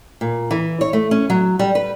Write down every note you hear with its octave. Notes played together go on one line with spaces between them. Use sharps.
A#2
E3
C#5
A3
C#4
F#3
G3
B4